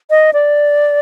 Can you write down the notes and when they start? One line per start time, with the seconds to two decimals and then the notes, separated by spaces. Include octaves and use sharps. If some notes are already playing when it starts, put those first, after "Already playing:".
0.10 D#5
0.33 D5